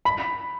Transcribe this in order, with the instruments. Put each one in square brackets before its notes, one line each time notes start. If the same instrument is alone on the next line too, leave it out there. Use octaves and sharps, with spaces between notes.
[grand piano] B5